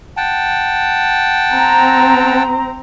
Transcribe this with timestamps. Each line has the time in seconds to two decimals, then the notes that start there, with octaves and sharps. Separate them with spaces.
0.17 F#5 G5 A5
1.54 C4 A#5